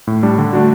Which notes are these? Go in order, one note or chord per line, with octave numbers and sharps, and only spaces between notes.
A2
G3 D4
D3
A3 D4 F#4